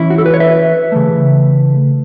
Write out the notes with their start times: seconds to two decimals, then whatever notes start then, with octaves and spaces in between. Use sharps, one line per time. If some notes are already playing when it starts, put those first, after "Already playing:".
Already playing: E3 C#4 E4
0.10 F#4
0.18 A4
0.26 B4
0.34 C#5
0.40 B4 E5
0.92 C#3 E3 A3